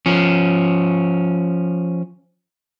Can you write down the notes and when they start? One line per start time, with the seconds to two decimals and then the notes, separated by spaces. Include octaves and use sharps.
0.06 F3 C#4